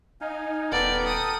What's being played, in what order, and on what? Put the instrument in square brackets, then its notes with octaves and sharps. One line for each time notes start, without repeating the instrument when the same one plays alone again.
[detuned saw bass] D#4 [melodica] F5 G#5
[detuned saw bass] D#1 [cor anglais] B3 [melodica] A4 A#4 G5 [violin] D5
[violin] D#6